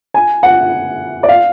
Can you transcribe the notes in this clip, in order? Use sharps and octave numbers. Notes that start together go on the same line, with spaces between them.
G#5
F#5
D5
F5